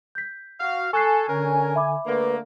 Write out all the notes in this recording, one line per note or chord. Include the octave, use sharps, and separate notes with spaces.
G6 B6
F#4 F5
A4 G#5 C#6 F#6 C7
D3 C#4 A#4
E5 B5 D6
D3 A3 A#3 B4